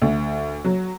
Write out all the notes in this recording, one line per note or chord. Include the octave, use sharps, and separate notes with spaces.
D2
F#3